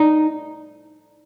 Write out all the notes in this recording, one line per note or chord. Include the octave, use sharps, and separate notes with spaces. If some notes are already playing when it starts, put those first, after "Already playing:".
Already playing: D#4